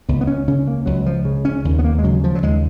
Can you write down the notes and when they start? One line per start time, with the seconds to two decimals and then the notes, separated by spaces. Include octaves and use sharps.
0.09 C#2 B3
0.21 B3
0.27 C#4
0.48 C#3 C#4
0.67 A#3
0.86 C#2 F#3
1.06 F3
1.25 C#3
1.45 C#4
1.65 D#2
1.79 B3
1.84 A#3
1.98 G#3
2.04 C#3 F#3
2.24 F3
2.35 F#3
2.43 D#2 G#3